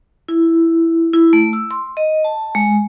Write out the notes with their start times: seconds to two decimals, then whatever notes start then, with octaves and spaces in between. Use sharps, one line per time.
0.28 E4
1.14 E4
1.33 A3
1.53 E6
1.71 C6
1.97 D#5
2.24 A5
2.55 G#3